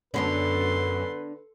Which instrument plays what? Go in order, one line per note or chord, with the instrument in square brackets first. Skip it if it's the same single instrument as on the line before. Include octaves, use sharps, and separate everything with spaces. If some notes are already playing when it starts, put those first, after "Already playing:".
[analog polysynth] F#2 [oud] D3 B3 D4 [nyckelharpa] A4 C6 [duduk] B4